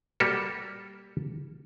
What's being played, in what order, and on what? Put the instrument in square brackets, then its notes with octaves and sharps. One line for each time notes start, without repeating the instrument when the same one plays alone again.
[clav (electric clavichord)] G3 A#3 F#4 G4 A4